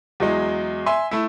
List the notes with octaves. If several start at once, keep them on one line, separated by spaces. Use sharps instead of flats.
E2 F#3 G#3
E5 G#5 C6
A3 E4